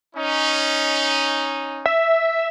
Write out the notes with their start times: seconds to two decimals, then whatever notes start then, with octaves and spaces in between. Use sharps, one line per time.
0.16 C#4 D#4
1.86 E5